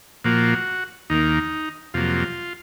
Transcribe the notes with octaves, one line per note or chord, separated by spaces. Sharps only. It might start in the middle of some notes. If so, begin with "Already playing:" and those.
A#2 F3 A#3 F#4
D#2 D#3 A#3 D#4
F2 C3 F#3 A#3 F4